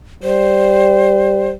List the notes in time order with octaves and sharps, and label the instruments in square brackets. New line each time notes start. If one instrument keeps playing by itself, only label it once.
[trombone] G3 [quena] C5